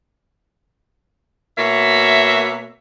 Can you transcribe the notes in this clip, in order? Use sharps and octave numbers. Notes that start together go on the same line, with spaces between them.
B2 A#3 C#5 E5